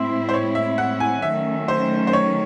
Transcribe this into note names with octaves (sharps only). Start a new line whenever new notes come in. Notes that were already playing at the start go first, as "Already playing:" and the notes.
Already playing: A2 G#3 C4 E4 E5 C6
C5
C#5
E5
F#5
G#5
D#3 F#3 A3 C#4 E5
C5
C5
C#5